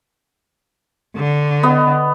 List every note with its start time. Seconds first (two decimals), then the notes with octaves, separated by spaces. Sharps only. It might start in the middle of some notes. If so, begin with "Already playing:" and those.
1.16 D3
1.63 B3 D#5